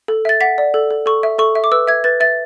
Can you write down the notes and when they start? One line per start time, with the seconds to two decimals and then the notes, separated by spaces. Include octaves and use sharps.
0.08 A4
0.25 E5 A6
0.41 F#5 B6
0.58 D5
0.74 A4
0.91 A4
1.06 A4 C#6
1.23 E5
1.38 A4 C#6
1.55 E5
1.64 D6
1.72 B4 E6
1.87 E5 G#6
2.04 B4 A6
2.20 E5 A6